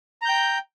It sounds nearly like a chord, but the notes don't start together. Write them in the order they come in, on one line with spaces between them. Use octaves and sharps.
A#5 G6 G5